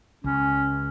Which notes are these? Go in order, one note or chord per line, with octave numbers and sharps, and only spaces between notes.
C#2 C#4